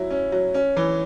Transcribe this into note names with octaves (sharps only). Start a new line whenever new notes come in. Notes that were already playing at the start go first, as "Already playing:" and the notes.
Already playing: F#3 E4
C#4
F#3
C#4
E3